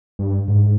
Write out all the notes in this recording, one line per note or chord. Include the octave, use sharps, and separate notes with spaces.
G2
G#2